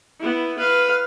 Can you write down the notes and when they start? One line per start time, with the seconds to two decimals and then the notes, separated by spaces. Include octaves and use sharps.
0.20 B3 E4
0.58 B4 F5